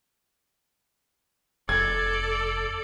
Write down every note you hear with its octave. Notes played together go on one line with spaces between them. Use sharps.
F1 A4 D5 G#6